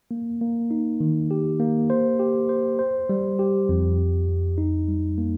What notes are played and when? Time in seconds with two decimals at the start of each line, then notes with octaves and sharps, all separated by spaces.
0.11 A#3
0.41 A#3
0.71 D#4
1.00 D#3
1.31 G4
1.60 A#3
1.90 C5
2.19 G4
2.49 C5
2.79 C5
3.09 G3
3.39 G4
3.69 F2
3.99 F2
4.29 F2
4.58 D#4
4.88 G3
5.18 A#3